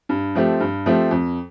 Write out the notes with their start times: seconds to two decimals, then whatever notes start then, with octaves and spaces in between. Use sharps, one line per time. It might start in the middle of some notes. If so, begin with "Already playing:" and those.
0.09 G2
0.35 F3 A3 C4 G4
0.60 G2
0.86 F3 A3 C4 G4
1.11 F2